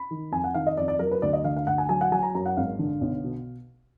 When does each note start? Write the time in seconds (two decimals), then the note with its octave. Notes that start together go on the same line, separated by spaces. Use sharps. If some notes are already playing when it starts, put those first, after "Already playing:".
Already playing: B5
0.11 D#3
0.32 F2 G#5
0.44 F#5
0.54 D#3 F5
0.67 D#5
0.77 F2 D5
0.88 D5
0.99 F#3 A#4
1.11 B4
1.22 D2 D5
1.33 D#5
1.44 D3 F5
1.56 F5
1.67 D2 F#5
1.78 G#5
1.89 F#3 G#5
2.01 F#5
2.12 F#3 G#5
2.23 A#5
2.35 F#2 A#5
2.46 F#5
2.57 G#1 F5
2.79 D3
3.01 B1
3.24 B2